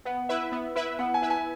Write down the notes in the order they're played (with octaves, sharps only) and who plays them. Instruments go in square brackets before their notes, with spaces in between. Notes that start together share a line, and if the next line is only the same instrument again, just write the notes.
[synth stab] B3 [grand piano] F#5
[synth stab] E4 B4 E5
B3
E4 B4 E5
[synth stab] B3 [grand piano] F#5
[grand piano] G#5
[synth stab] E4 B4 E5
[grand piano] G#5